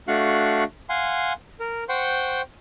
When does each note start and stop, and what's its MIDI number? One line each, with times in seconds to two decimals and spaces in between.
0.08 0.64 57
0.08 0.64 62
0.08 0.64 66
0.08 0.64 77
0.08 0.64 85
0.08 0.64 90
0.89 1.33 77
0.89 1.33 78
0.89 1.33 80
0.89 1.33 84
1.60 1.84 70
1.89 2.41 72
1.89 2.41 78
1.89 2.41 79
1.89 2.41 84
1.89 2.41 85